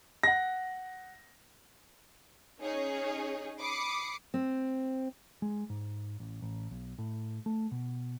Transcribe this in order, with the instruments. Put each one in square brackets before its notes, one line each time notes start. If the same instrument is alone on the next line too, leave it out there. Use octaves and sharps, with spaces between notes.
[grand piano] F#5 A#6
[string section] C#4 D#4 G#4 C#5
B5 D6 D#6 C7 C#7
[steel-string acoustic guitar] C4
[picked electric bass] G#3
G#2
A1
A1
B1
A2
A3
B2